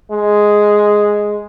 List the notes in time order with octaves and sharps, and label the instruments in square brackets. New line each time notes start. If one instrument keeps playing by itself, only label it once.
[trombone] G#3